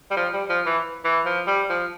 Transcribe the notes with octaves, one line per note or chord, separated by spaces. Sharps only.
G3
F3
G3
F3
E3
E3
F3
G3
F3